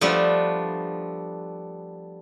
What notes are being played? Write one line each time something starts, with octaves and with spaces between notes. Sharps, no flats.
F3 G3 A3 B3 D4